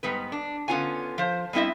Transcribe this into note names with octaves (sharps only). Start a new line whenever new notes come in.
G#2 G3 B3 B4
D4
D3 B3 C#4 F4 F#5 G#5
F3 C5
G3 B3 C4 E4 D#5 E5